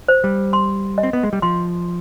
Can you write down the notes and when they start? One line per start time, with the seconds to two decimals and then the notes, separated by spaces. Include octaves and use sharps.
0.08 C5
0.24 G3
0.53 C6
0.98 D#5
1.03 C4
1.13 B3
1.23 G#3
1.33 G3
1.42 F3 C6